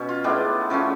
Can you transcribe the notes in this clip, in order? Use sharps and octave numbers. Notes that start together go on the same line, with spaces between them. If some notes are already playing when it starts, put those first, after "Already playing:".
Already playing: B2 C#4
F4
A2 G#3 B3 D4
C#3 F3 A3 C#4